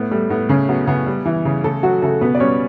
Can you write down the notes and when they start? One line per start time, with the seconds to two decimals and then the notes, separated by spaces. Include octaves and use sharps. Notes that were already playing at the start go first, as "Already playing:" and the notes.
Already playing: A2 B3
0.11 G3 A3
0.30 A2 B3
0.49 C#3 C#4
0.68 F#3 B3
0.87 C#3 B3
1.06 G3
1.25 E3
1.45 C#3
1.64 C#3 A3 A4
1.83 F#3 F#4
2.02 C#3 A3 A4
2.21 B2 B3 B4
2.35 D5
2.40 G3 C#4 C#5